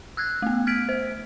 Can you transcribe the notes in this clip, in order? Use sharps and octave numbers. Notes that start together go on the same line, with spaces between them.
E6 F#6 G#6
A3 B3
F6 G#6 B6 D7
C5